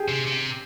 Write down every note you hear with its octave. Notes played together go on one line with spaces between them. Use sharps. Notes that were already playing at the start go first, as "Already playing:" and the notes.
Already playing: G4 G#4
C3
C3